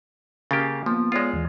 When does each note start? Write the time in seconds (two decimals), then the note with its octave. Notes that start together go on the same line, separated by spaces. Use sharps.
0.51 C#3 A#3 G4 A6
0.86 F3 A#3 B3
1.12 G#3 B3 F4 C#5 D5
1.33 D#2 E3